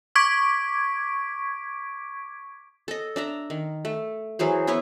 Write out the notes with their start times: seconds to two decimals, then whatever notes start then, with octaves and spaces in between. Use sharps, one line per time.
0.15 C#6 D6 G#6 B6 D7
2.88 A4 D#5
3.16 D4 E5 A#5
3.50 D#3
3.85 A3
4.39 E3 F#3 G#4 C5
4.67 B3 E4 B4 C#5